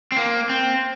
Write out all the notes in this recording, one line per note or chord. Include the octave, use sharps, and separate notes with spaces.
C4
A#3
C4